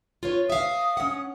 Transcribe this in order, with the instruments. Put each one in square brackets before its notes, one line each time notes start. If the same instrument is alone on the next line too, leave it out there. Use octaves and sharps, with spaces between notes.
[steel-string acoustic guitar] F4 B4 C#5
[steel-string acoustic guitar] E5 F5 [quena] D#6
[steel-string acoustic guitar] C#4 F#5